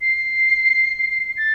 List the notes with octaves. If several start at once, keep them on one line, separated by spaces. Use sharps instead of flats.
C7
A6